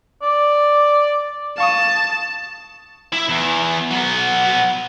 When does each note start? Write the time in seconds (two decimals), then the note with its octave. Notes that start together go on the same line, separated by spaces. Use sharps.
0.22 D5
1.58 F5 A5 C#6 D#6
3.12 E4 E5
3.29 E2
3.91 F#3 B3